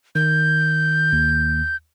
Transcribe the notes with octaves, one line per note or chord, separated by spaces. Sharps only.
D#3 G6
D#2